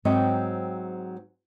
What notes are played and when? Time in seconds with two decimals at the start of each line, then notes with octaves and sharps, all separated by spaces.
0.05 G#2 F#3 C4 C#5 D#5 G5